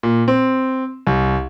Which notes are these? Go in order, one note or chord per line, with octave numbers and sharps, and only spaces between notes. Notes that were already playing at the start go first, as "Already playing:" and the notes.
A#2
C4
C2